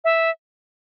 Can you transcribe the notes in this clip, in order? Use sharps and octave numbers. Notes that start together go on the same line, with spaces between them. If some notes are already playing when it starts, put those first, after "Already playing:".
E5